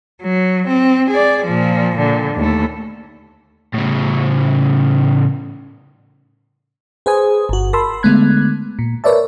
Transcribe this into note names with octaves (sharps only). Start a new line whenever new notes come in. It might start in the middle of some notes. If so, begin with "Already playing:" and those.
F#3
C4
G#4 D5
A#2 F3
A#2 D3
D#2 A3
A2 C#3
G#4 B4 C5 G#5 D#6
G1 F#4
A#4 A5 B5 C6 E6
D3 G#3 A3 B3 F#6 G#6
A#2
A#4 B4 C#5 D5 E5 A5